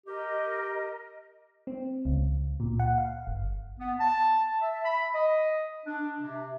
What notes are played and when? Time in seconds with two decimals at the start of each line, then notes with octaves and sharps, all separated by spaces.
0.06 G4 A#4 D#5
1.67 C4
2.05 C#2
2.60 A#2
2.79 F#5
2.98 F5
3.27 G1
3.80 B3
4.00 A5
4.61 E5
4.84 B5
5.14 D#5
5.86 D4
6.20 C3